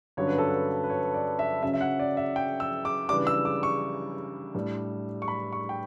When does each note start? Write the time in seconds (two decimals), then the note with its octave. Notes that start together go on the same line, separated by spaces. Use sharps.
0.17 G2 D3 F#3 C#4 C#5
0.27 B4
0.38 A4
0.48 B4
0.84 B4
0.90 C#5
1.14 D5
1.39 E5
1.63 C#3 F#3 C#4 E5
1.73 E5
1.81 F#5
2.00 D5
2.17 E5
2.36 G5
2.60 E6
2.85 D6
3.09 C#3 E3 G3 D4 D6
3.27 E6
3.45 D6
3.63 C#6
4.55 A2 G3 D4
5.22 C#6
5.28 B5
5.53 C#6
5.69 G5